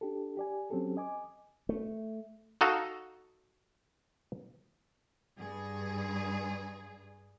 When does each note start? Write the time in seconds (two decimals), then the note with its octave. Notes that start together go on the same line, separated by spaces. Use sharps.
0.01 D4 G4 A4
0.37 G4 D5 G#5
0.70 F#3 C4 C#4 G4 A4
0.97 D#5 G#5 D6
1.69 A3
2.61 D#4 F#4 A4 D#5 F5
5.36 G2 G#4